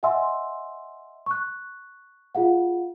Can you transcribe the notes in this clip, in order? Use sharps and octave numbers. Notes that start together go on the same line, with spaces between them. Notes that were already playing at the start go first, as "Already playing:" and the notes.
D#5 E5 F#5 G#5 C6 E6
C#6 F#6
F4 G#4 F5 F#5